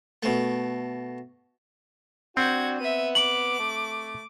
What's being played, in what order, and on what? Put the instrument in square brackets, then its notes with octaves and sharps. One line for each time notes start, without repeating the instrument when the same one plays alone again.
[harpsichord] B2 A3
[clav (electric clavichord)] C4 [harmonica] D4 F#4 G5 [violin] F#5 G#6
[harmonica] B3 [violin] E5 D#7
[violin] D6 [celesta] F#7
[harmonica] A3